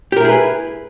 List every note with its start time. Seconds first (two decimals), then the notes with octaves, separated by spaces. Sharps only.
0.12 G4
0.17 A#4
0.21 E4
0.25 G#4
0.29 B4